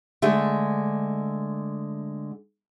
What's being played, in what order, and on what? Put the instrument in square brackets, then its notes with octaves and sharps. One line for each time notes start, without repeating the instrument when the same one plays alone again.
[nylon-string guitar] D3 G#3 A3